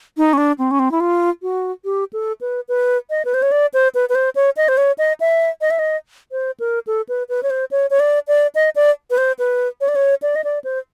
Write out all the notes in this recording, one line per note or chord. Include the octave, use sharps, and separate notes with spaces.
D#4
C#4
D4
C4
C#4
C4
E4
F4
F#4
G4
A4
B4
B4
D#5
B4
C5
C#5
D5
C5
B4
B4
C5
C#5
D#5
C5
C#5
D#5
E5
D#5
E5
D#5
C5
A#4
A4
B4
B4
C#5
C5
C#5
C#5
D5
D5
D#5
D5
B4
C5
B4
C#5
D5
C#5
D5
D#5
D5
C5